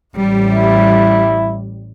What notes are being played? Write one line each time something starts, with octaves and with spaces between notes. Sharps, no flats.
A1 G3
E4